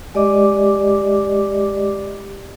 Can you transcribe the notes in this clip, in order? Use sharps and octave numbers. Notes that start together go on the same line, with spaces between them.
G#3 G4 D5 D#5 D6